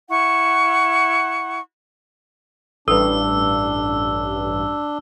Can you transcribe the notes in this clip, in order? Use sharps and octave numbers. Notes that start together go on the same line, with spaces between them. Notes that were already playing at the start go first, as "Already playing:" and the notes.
E4 F#5 C#6
A1 G2 D4 A4 B4 E6